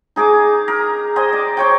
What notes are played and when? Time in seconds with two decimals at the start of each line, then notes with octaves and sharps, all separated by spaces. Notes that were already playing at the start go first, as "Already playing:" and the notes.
0.16 D#4 G#4 A#5 D6
0.68 A#4
1.16 A#4 C5 D#5 G#5
1.33 D5
1.57 C5 C#5 G5